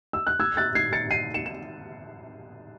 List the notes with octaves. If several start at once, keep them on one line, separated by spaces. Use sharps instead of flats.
E6
F#6
E6 G#6
F#6 A6
G#6 C7
A6 C#7
C7 D#7
C#7 E7
E7